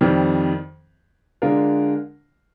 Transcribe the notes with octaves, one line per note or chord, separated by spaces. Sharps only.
F2 D#3 G3 C4
D3 G#3 D4 F4 A#4